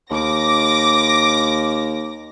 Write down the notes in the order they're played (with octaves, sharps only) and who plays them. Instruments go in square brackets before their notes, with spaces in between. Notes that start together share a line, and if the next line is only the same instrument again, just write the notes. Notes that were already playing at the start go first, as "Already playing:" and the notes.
[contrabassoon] D#2 [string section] D6 A#6